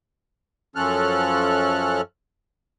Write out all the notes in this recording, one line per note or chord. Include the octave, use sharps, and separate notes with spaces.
F#2 F3 C#4 A4 F6 F#6